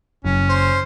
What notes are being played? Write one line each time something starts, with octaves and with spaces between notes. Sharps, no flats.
F#1 F#2 C#4
C5